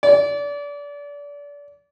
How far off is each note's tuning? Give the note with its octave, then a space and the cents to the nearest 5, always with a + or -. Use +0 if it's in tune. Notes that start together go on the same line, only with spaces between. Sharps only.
D5 -30